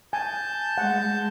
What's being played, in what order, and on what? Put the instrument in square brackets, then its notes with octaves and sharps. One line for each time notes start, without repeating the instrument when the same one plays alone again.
[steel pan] G#5 [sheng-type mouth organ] A5 G6
[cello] G#3 [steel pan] F#5